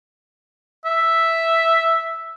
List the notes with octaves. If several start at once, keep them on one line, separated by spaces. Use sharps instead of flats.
E5